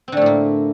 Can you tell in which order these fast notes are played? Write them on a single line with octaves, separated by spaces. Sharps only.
C4 D3 A3 A2 A#3